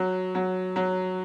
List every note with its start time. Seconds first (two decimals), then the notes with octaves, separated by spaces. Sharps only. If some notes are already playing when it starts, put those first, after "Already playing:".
Already playing: F#3
0.35 F#3
0.76 F#3